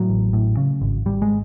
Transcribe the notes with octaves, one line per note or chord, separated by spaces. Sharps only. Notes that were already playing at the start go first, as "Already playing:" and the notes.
Already playing: A2 F#3
A1
A2
C#3
G#1
G#1 G3
G#3